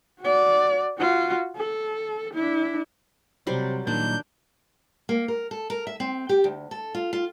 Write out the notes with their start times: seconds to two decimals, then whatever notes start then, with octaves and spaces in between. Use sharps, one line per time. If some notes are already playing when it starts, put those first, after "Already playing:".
0.21 F#4 D5
0.98 F4 F#4
1.56 A4
2.34 D4 E4
3.47 C3 F#3 G3 C5
3.87 A#2 D#3 F#3 D4 D#4 G6
5.09 A#3
5.28 A#4
5.51 A4
5.70 A#4
5.87 E5
6.00 C4
6.29 G4
6.44 D2
6.71 A4
6.95 F4
7.13 F4